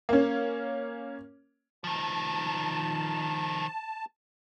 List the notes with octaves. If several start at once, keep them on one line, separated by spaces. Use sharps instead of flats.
A#3 C#4
D#3 F3 A5